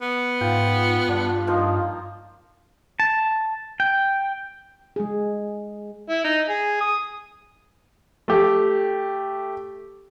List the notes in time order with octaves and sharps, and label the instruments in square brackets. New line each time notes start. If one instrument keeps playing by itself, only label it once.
[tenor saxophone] B3
[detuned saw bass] G#2 [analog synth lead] F4 [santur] G5
[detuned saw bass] G2 [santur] D4
[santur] F3 A#3 D#4
[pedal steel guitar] A5
G5
[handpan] G#3 G#4
[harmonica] E4
D#4
G#4
D#6
[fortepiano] A3 G4